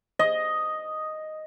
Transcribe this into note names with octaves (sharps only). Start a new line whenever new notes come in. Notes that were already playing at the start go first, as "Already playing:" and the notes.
D#5